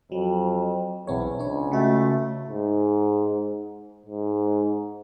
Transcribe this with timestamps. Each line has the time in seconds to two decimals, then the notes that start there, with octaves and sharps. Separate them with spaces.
0.12 F2 F#3
1.07 B1 E2 C4 C#5
1.39 C#2 D4 C#5
1.71 C#3 A3 F#4
2.49 G#2
4.06 G#2